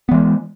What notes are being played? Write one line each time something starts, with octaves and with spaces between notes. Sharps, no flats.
E3 G#3 B3